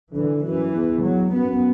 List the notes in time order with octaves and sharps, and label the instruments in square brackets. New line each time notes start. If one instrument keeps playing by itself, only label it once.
[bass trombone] D3 [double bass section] E3
[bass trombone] F#2 [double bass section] E3
[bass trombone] E2
[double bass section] F#3
[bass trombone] F#2 [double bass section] B3